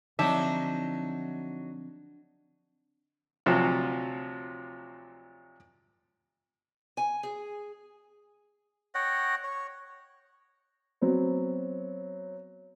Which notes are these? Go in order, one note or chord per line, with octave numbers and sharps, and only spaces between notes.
D3 F3 F#3 C4 D4 D#4 E5
D2 C3 F3 F#3
G#5
G#4
C#5 D#5 F#5 G5
C#5
F#3 B3 C4